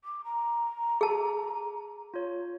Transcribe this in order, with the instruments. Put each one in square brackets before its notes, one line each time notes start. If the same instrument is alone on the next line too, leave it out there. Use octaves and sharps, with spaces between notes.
[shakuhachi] D6
A#5
[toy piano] G#4 A5
[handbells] F4 C#5